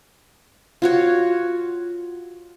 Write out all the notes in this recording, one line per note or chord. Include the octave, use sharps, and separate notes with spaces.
F4 F#4 C#5